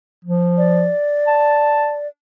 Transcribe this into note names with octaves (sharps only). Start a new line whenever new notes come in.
F3
D5
A5